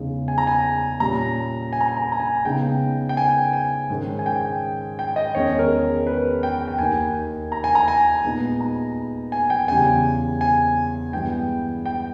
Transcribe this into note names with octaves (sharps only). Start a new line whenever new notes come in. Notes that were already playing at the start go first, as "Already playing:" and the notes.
Already playing: E2 C#3 G#3 D#4
G#5
A#5
G#5
A#2 G3 C#4 A#5
G#5
A#5
G#5
A#5
G#5
A#5
G#5
C#3 G#3 B3 D#4 G5
G5
G#5
G#5
G#2 D#3 G#3 C#4
G#5
G5
G5
D#5
E2 D#3 G#3 C#4 C#5
A#4
B4
G5
G5
D#2 D#3 A#3 D#4 G#5
A#5
G#5
A#5
G#5
A#2 G#3 B3 D#4
A#5
G#5
G5
E2 C#3 E3 G3 G#5
G#5
G2 E3 G#3 B3 G5
G5